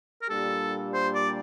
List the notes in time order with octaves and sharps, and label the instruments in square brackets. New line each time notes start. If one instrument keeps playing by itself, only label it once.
[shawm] A#4
[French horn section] A#2 G3 A#3 D4 G4 [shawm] A4
[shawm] C5
D5